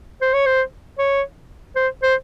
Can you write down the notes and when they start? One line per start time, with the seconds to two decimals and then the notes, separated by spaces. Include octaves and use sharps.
0.22 C5
0.34 C#5
0.46 C5
0.99 C#5
1.76 C5
2.03 C5